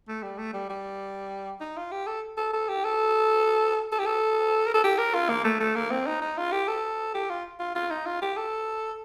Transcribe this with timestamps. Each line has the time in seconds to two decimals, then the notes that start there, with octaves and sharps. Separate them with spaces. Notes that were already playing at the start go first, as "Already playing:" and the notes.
0.08 A3
0.23 G3
0.38 A3
0.54 G3
0.70 G3
1.61 D#4
1.77 F4
1.91 G4
2.07 A4
2.37 A4
2.53 A4
2.68 G4
2.84 A4
3.92 A4
3.99 G4
4.06 A4
4.66 A#4
4.74 A4
4.84 G4
4.98 A#4
5.14 F4
5.29 A#3
5.44 A3
5.60 A3
5.75 A#3
5.91 C4
6.06 D#4
6.21 D#4
6.38 F4
6.52 G4
6.68 A4
7.14 G4
7.30 F4
7.59 F4
7.75 F4
7.90 D#4
8.06 F4
8.22 G4
8.37 A4